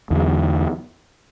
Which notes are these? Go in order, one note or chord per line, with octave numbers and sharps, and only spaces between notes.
E2 D3 F#3